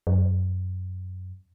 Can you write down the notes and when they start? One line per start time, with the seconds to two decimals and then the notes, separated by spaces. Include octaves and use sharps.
0.07 F#2